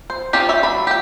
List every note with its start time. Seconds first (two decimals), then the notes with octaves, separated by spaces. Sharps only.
0.10 C5
0.33 C4 C#4 F4 G4
0.49 C#5 D5 E5
0.63 F#3 B5
0.87 G4 G5